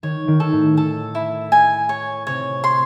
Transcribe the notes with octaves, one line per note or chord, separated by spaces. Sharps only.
D#3 C#5
D#3
A4
A2
A4
E4
G#5
C#5
C3 C#5
C6